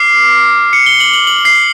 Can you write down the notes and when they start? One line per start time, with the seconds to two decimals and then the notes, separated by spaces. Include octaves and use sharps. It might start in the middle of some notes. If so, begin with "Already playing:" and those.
Already playing: D6 F6 C7
0.73 C#7
0.86 G7
1.00 F#7
1.14 F#7
1.27 F#7
1.45 C7